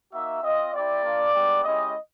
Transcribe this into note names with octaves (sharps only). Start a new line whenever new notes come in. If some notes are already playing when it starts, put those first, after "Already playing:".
A#3 D#4 F#4 E5
C4 F4 D#5
C4 E4 G4 D5
A#3 D4 F4
G#3 B3 D4 G4
G#3 C#4 E4 G4 D#5